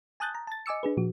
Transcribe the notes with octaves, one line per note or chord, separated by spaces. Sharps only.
G#5 A5 D#6 F#6 G6 A6
A#5
A5 A6
D#5 G#5 D6 E6 C#7
D4 G#4 B4
A#2 F3 F#4